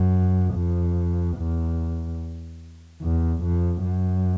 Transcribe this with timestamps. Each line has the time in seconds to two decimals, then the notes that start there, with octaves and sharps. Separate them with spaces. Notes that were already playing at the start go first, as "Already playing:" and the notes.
Already playing: F#2
0.54 F2
1.37 E2
3.02 E2
3.44 F2
3.85 F#2